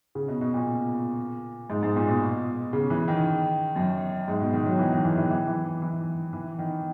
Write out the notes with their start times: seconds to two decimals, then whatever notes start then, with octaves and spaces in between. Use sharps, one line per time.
0.15 C#3
0.28 B2
0.41 B2
0.54 A#2
1.70 G#2
1.83 G#2
1.96 A#2
2.08 B2
2.73 C#3
2.90 E3
3.08 D#3
3.76 F#2
4.28 G#2
4.41 B2
4.53 D#3
4.66 F#3
4.79 E3
4.92 D#3
5.05 E3
5.18 E3
5.31 E3
5.47 E3
5.82 E3
6.33 E3
6.59 D#3